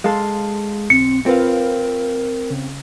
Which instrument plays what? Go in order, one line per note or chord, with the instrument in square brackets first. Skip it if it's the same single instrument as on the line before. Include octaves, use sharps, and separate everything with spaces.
[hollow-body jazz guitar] G#3 A4 [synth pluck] F5 C6
[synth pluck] B1 [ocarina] C4 [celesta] C#7
[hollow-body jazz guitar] C4 [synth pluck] F4 B4 F5 [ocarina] A#4
[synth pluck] C#3